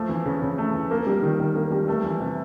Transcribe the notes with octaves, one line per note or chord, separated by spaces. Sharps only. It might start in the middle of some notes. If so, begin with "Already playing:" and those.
Already playing: F3 A3
E3
C#3
C#3
A3
E3
A#3
G3
D#3
D#3
A#3
G3
A3
E3
C3